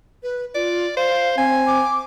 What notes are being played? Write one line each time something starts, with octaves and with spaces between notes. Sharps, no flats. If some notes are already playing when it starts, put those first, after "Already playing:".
B4
F4 D5
C5 F5
C4 G#5
D6